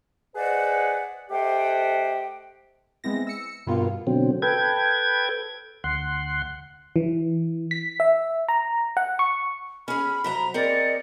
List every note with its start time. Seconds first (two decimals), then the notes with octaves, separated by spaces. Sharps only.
0.35 G#4 B4 C5 D5 D#5 F#5
1.30 A3 G4 C5 D#5 F#5 G5
3.04 G#3 B3 C4 E4 A#6
3.27 E6 C#7
3.67 G2 B2 A#3 B3 F4
4.07 B2 D3 F#3 C4
4.42 A4 B4 G5 G#6
5.84 D2 F#5 C6
6.96 E3
7.71 B6
8.00 E5
8.49 A#5
8.97 F#5
9.19 C#6
9.88 C#4 G#4 B5 F6
10.24 C3 F#3 A#5 B6
10.54 C4 G#4 A#4 D5 D#5 C#7